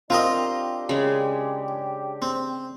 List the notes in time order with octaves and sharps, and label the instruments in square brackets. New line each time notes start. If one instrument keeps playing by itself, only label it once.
[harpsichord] C4 A#4 D#5 [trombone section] D4 G4 [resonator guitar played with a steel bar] F4
[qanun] C#3 G#3
[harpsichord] C4